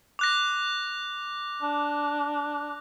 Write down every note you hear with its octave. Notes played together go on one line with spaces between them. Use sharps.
D6 F#6 A#6
D4